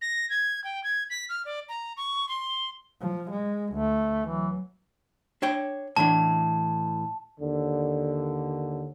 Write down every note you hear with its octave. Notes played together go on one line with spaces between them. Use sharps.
A#6
G#6
G5
G#6
B6
F6
D5
A#5
C#6
C6
F3
G#3
D2 A3
E3 F#3
D4 C#5 G5
A2 E3 D4 A5
D#2 D3